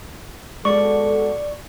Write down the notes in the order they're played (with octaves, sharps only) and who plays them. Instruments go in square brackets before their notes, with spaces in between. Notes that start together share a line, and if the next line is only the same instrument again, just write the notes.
[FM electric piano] G#3 [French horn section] B3 F#4 A4 [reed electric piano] D5 [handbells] C#6